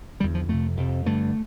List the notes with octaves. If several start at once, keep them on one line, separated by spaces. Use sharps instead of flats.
E2 D3 G3
F3
F2 C3 A3
F2 C3
G2 D3 A3